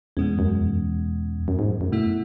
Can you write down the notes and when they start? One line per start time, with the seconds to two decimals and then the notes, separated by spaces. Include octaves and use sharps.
0.17 E2 B2 G#3 C#4
0.39 F#2
0.61 E2
1.48 F#2
1.59 G#2
1.70 F#2
1.81 F#2
1.92 B2 A3 E4